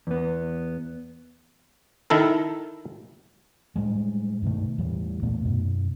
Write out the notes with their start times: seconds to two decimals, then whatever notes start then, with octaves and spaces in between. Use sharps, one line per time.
0.07 E2 B3
2.10 D#3 E4 A4 A#4
3.76 A2 G3 G#3
4.42 G2 B2 D#3 A3
4.78 E2 A2 E3 G3
5.23 E2 A#2 A3 B3
5.45 F#2 B2